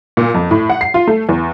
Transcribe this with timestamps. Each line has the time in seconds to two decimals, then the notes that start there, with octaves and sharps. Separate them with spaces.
0.17 A#2
0.34 F2
0.51 A2
0.70 F#5
0.81 C7
0.94 F4
1.07 A3
1.29 E2